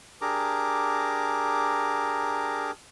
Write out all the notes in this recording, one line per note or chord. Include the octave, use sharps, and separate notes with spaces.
D4 G4 G#4 A#4 A#5 D6